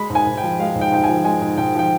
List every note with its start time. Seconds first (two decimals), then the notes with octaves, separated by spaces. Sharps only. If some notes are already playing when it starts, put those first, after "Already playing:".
Already playing: G#3 B5
0.10 G#2
0.15 G#5
0.27 G#2
0.37 G5
0.43 F3
0.59 G#3 F5
0.75 G#2
0.81 G5
0.92 G#2 G5
1.04 G#5
1.09 F3
1.25 G#3 G#5
1.41 G#2
1.58 G#2 G5
1.75 F3 G5